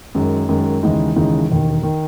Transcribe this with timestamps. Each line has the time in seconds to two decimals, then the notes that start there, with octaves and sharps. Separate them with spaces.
0.15 F#2 D#3 G#3
0.49 F#2 D#3 G#3
0.83 D#2 C#3 E3 G#3 D#4
1.16 D#2 C#3 E3 G#3 D#4
1.50 E1 D#2 D#3
1.83 D#3